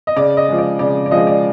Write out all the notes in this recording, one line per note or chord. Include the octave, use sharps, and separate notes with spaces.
D#5
C#3 D5
D#5
F3 G#3
D5
C#3 D5
D5
F3 G#3 D#5
D5